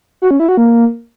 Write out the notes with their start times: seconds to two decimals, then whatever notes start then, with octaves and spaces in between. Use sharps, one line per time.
0.22 F#4
0.31 C#4
0.40 E4
0.49 F#4
0.57 A#3